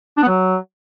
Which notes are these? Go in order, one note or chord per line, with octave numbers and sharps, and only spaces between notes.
D4
B3
F#3